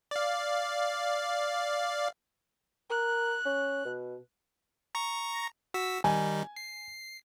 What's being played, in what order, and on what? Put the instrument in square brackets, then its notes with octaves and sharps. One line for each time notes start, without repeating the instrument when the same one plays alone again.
[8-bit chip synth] D5 F5
[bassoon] A#4 [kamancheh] F#6
[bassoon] C#4
B2
[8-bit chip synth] A#5 C#6 A#6
F#4 E6 B6
[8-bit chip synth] D#3 G3 D#4 [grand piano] G#5
[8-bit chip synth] C7